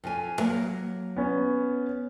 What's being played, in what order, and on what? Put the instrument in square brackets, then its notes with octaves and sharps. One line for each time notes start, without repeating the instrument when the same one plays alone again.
[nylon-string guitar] F2 F3 G#5
F#3 A#3
[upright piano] B3 C#4